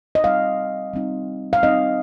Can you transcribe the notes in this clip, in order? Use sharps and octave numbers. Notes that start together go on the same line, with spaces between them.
D#5
G3 C4 D#4 F5
G3 C4 D#4
F5
G3 C4 D#4 D#5